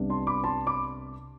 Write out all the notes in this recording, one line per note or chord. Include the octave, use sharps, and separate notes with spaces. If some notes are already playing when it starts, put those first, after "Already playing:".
Already playing: C2 C3 G3 B3 D4
A5 C6
B5 D6
A5 C6
B5 D6